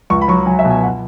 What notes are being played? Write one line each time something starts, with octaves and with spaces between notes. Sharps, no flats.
C#2 C#6
B5
F#3 C#6
F#3 G#5
E5
B2
G#5
F#5